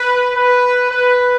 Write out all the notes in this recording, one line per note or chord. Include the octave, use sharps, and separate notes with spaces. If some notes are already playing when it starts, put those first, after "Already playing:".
Already playing: B4
B4
B4